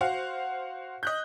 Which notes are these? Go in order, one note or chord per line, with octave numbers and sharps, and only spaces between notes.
F#4 C5 F5 F#5
D#5 F#6 G6